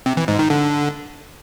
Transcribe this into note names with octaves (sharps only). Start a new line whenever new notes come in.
C3
E3
G#2
D#3
D3